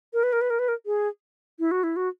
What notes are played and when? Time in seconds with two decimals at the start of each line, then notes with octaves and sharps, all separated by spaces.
0.14 A#4
0.23 B4
0.33 A#4
0.41 B4
0.50 A#4
0.59 B4
0.68 A#4
0.86 G#4
1.59 E4
1.71 F#4
1.84 E4
1.96 F#4